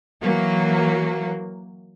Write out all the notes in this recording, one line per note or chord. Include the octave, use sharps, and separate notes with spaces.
E3 F#3 A#3